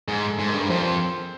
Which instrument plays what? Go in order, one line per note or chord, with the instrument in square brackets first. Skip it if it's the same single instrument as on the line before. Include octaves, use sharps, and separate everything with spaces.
[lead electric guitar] G#2 [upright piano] G#4
[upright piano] A4
[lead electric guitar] G#2
[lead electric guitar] G2 [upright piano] A#4
[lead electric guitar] F2 [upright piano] C5